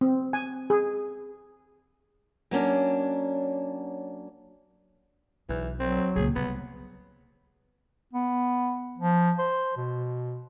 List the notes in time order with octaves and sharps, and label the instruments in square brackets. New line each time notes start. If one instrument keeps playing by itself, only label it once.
[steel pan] C4
G#5
G#4
[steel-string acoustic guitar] F#3 A#3 C#4 D4
[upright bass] B1 [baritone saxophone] E3
[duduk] F#3 [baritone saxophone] C4
[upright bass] C#2 A#2 [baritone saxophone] G#4
[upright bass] C2 [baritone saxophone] B3
[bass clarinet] B3
F3
C5
B2